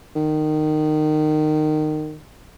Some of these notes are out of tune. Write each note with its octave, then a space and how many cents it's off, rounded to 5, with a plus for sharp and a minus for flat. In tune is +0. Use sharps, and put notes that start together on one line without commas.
D#3 -20